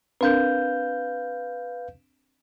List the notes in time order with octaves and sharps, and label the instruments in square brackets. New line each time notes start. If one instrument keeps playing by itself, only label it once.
[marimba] C4 D4 A#4 [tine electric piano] B4 F5 G6